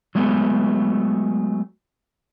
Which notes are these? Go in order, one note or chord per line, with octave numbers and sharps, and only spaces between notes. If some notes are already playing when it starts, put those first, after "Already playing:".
F#3 G#3 A3 B3